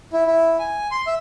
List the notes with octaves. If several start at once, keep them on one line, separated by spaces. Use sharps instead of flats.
E4
E4
G#5
C6
E5